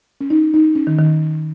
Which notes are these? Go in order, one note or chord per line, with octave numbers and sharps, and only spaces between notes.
C#4
D#4
D#4
C#4
D#3
D#3